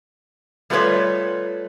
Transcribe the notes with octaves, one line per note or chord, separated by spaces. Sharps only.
G3 A3 F4 G#4 B4 C#5